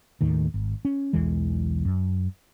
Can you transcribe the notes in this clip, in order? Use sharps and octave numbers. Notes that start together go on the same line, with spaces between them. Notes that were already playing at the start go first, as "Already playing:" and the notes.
D#2 A2 D#3
G#1
C#4
B1 E2 E3 G#3
F#2